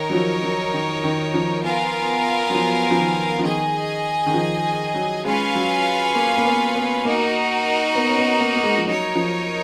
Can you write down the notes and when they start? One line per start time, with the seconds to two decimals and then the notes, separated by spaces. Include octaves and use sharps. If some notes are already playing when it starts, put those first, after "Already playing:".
Already playing: D#3 D#4 A#4 C#5
0.10 F#3
0.13 F3
0.43 F#3
0.74 D#3
1.04 D#3
1.34 F3
1.63 B3 F4 A#4 F5 G#5
2.50 F#3
2.55 F3
2.91 F3
2.99 D#3
3.39 F3
3.44 D#3 G#4 D#5 G#5
4.26 D#3
4.34 F3
4.94 F#3
5.25 G#3 C#4 F4 B4 F5 G#5
5.55 F#3
6.15 A#3
6.37 A#3
6.45 B3
6.75 B3
7.05 A#3 D#4 F#4 A#4
7.95 B3
8.08 C#4
8.18 B3
8.41 A#3
8.56 A#3
8.63 G#3
8.78 F3
8.86 F#3 D#4 A#4 C#5
9.15 F3